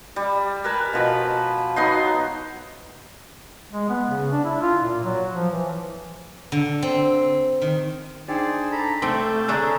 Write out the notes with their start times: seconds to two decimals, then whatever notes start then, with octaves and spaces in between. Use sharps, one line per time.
0.16 G3
0.64 A#4 B4 G#5 A5
0.93 B2 F3 B5
1.76 F#3 B3 D#4 C6
3.71 G#3
3.89 B3
4.08 C#3
4.31 D4
4.44 E4
4.61 F4
4.82 A#2
5.04 F#3
5.34 F3
5.51 E3
6.52 D3
6.82 C4
7.62 D#3
8.28 D4 D#4 G#4 C5 D5 G5
8.72 A4 A#5 B5
9.02 C2 A3 C4 A5 D6 G6
9.48 D3 D4 G#4 C#5 E5 G#5 A#5